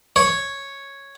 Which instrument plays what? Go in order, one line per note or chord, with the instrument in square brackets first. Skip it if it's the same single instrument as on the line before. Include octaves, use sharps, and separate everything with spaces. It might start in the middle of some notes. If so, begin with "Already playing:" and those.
[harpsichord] C#5